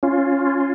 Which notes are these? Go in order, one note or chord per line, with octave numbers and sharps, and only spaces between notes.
C#4 F4